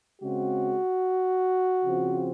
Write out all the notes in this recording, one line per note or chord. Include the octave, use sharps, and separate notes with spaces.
C#3 G#3 C4 F#4
C#3 F3 C4